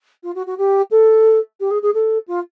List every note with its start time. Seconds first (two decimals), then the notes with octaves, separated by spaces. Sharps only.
0.23 F4
0.35 F#4
0.46 F#4
0.58 G4
0.91 A4
1.60 G4
1.70 G#4
1.82 G#4
1.94 A4
2.27 F4